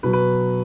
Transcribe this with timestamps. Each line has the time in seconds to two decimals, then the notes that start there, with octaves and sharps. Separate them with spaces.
0.03 B2 F#3 B4
0.13 B4